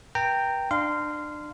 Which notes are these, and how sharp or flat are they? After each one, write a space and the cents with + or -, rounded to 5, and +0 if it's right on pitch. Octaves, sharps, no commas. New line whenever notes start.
B4 -45 G5 +0 A#5 -25
D4 +30 F5 -10 C6 -25